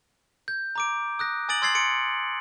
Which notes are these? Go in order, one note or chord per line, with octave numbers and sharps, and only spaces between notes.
G6
A#5 D6 D7
D#6 F#6 A#6
G#5 D#6 A6 D7 F#7
C6 E6 G#6 A6 C7 F#7
C6 C#7 D7